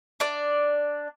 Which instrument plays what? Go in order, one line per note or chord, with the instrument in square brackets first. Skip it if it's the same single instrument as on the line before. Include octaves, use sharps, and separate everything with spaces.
[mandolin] D4 D5